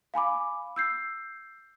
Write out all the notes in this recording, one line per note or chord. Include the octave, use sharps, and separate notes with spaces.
F5 G#5 B5 D6
E6 G6 C7